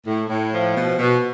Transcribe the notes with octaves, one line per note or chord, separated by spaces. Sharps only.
A2
A2
F3
B2
B2